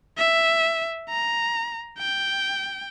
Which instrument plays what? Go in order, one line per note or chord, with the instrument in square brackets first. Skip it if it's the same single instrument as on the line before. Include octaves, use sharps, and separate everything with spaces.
[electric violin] E5
A#5
G5